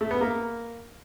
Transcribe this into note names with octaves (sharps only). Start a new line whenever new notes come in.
A3
B3
A#3